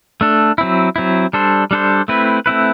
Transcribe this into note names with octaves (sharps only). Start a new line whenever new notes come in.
A3 D4 A4
F#3 C4 E4
F#3 C4 E4
G3 D4 A4 C5
G3 D4 A4 C5
A3 C4 E4 B4
A3 C4 E4 B4